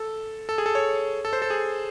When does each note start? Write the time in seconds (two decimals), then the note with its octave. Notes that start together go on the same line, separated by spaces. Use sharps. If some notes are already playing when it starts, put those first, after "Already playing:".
Already playing: A4
0.49 A4
0.58 G#4
0.66 A4
0.75 C#5
1.25 A4
1.33 C5
1.42 A4
1.50 G#4